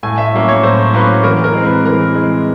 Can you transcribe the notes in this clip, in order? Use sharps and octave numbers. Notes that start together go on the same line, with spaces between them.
A2 G#5
E5
F#3 A#3 C#4
C#5
A2 C5
F#3 A#3 C#4 B4
E3 A#4
A#4
G#3 C4
B4
E3 A#4
G#3 C4